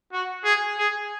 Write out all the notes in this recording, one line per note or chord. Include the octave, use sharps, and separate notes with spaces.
F#4
G#4
G#4